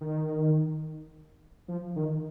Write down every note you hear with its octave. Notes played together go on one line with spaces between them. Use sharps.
D#3
F3
D#3